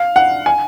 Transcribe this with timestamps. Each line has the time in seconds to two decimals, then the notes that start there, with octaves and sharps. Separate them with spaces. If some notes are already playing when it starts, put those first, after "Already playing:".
Already playing: F5
0.16 F#5
0.46 G#5